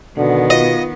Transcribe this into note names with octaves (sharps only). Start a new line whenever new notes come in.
B2 D3 D#3 B3
F4 D#5